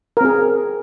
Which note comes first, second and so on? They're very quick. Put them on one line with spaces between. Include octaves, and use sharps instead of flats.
A#4 C4 G#4